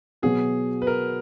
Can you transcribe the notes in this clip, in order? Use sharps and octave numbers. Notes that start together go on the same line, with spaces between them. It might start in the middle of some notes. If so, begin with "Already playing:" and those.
B2 F#3 B3 F#4 G#4
B4
A#4